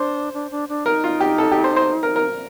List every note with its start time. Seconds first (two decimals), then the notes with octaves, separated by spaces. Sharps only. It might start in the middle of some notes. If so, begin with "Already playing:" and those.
Already playing: D4 C5
0.34 D4
0.51 D4
0.69 D4
0.85 D#4 A#4
1.04 F4
1.20 G4
1.38 A4
1.52 G4
1.64 C5
1.76 C5
2.03 A#4
2.16 A#4